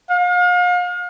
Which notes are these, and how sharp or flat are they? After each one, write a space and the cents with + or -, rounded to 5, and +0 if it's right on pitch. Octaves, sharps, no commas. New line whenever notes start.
F5 +40